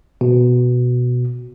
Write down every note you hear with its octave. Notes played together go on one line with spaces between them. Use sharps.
B2